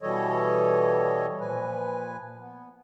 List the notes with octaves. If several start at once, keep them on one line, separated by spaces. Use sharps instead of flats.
B2 E3 G3 A4 C#5 D#5
A#2 F3 B4 G#5
B3